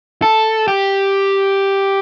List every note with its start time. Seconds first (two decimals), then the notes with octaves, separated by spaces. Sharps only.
0.22 A4
0.68 G4